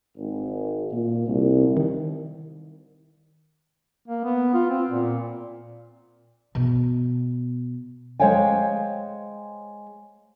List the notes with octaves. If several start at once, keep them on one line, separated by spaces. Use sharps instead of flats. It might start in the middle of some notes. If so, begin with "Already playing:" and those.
G#1
A#2
C2
D#3
A#3
B3
F4
C4
A#2
B2 B3
G#3 C5 C#5 F5 G5 G#5